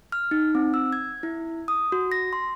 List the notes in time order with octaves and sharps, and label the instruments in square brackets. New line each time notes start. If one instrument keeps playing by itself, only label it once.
[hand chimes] F6
D#4
C4
E6
G#6
E4
D#6
F#4
A#6
C6